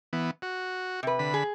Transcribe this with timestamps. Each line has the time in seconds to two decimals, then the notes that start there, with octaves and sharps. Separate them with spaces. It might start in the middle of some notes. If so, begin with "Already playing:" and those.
0.13 E3 B3
0.42 F#4
1.03 C3 B4
1.19 D3 B5
1.34 G#4